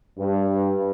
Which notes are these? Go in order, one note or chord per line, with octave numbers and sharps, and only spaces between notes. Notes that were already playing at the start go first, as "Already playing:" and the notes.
G2